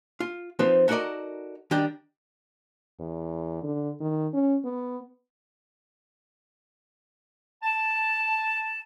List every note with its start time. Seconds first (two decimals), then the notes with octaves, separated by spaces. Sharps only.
0.20 F4
0.59 F3 C4 D#4 B4 C5
0.88 D#4 F#4 A4 A#4 D5 D#5
1.71 D#3 G3 D4 D#5 G5
3.00 E2
3.63 D3
4.01 D#3
4.34 C#4
4.65 B3
7.63 A5